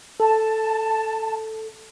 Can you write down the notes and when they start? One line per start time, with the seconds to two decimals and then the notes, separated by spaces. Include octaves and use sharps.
0.20 A4 A5